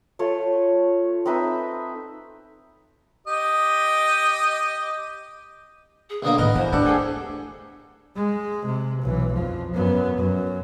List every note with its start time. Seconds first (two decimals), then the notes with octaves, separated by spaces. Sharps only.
0.19 A3 F4 C#5
1.26 C4 D#4 B4 E5
3.27 G4 D#5
6.09 G#4
6.23 B1 D3 A#3 D#6
6.38 A2 D#3 B3 A#4 D#5
6.55 E2 C5
6.73 A3 D4 G4 A4 F#5
6.85 G#4 A4 G#5
8.16 G#3
8.65 C3
9.02 B1 E3
9.33 F2 F3
9.73 F#2 B3
10.17 F#2